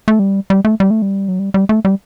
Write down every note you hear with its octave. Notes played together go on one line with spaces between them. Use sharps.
A3
G3
G3
A3
G3
A3
G3
F#3
G3
G3
A3
G3